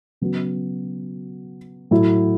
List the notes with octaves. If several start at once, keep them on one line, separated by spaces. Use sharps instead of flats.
C#3 F#3 B3 F#4
A2 F#3 A3 E4